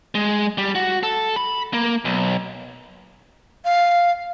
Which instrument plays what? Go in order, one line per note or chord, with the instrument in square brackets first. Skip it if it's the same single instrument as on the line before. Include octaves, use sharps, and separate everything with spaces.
[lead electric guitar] G#3
G3
F#4
A4
B5
A#3
B1
[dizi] F5